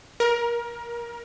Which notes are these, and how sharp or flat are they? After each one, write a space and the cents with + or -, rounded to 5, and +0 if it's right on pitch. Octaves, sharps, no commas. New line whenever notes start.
A#4 +20